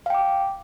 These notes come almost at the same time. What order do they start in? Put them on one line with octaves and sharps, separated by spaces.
F5 G5 D6